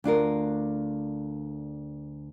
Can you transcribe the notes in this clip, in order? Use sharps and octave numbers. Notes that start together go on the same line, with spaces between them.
D2 D4 F4 A#4